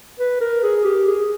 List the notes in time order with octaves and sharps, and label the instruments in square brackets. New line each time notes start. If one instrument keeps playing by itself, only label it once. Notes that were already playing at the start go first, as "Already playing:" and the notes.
[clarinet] B4
A#4
G#4
G4
G#4